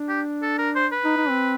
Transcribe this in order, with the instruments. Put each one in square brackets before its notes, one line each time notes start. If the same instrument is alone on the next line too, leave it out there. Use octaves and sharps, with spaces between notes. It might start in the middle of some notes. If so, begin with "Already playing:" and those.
Already playing: [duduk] D4
[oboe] G4
A4
A#4
C5
B4
[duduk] D#4
D#4
C4